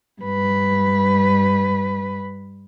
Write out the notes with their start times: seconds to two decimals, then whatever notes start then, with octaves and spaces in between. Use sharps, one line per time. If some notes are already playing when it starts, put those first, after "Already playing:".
0.22 G2 B4